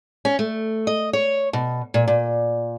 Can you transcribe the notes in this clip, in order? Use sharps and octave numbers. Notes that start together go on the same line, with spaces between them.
C#4
A3
D#5
C#5
B2
A#2
A#2